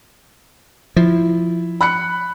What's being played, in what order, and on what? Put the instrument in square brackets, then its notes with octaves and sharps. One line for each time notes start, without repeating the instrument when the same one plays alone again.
[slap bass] F3 [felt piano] E4
[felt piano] B5 F#6 C#7